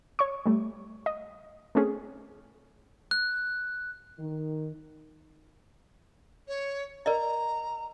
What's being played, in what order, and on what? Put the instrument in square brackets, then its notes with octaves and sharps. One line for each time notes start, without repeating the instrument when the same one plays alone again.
[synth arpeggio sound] C#5 C#6
G3 A3
D#5
A3 C4 C#4 G#4
[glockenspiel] F#6
[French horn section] D#3
[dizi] C#5
[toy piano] A#4 D5 D#5 [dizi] A#5